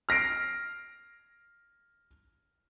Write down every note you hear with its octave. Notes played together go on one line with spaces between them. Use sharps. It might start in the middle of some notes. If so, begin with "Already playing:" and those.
F6 A#6 C7 D7